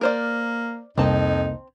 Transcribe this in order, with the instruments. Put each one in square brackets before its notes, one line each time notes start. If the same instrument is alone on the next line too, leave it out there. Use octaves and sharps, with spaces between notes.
[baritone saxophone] A#3 [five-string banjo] A#4 C5 D5
[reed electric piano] C2 A#3 [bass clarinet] F2 [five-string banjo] C4 A5 [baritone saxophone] D#4